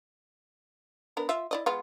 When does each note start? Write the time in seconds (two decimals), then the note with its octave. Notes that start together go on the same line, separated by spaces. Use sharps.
1.17 B3 D4 A#4
1.29 F4 E5
1.51 E4 D5 D#5
1.66 G#3 B3 F4